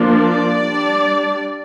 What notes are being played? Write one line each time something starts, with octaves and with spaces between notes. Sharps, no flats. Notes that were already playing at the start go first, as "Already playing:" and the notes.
Already playing: F3 A#3 D4
D5
G3 D4